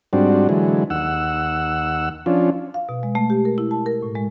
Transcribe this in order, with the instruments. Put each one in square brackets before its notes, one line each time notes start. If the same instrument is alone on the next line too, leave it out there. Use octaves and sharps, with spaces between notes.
[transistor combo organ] G#2 G3 C4 D4 F#4
D3 E3 F#3 G#3
D#2 F#5 E6
F3 C#4 D4 F4
[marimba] F5
B2
G#3
A3
G4
A#4
E4
A5
A#4
A2
G#3